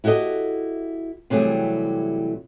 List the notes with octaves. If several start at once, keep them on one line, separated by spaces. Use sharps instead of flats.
E4 F#4 G4 A4 D#5
C3 E3 F#3 G3 A3 G#4